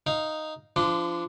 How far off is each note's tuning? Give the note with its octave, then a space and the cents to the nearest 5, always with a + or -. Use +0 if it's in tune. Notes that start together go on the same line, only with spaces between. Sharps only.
D#4 +0 F5 +0
F3 -25 D4 +0 C6 -40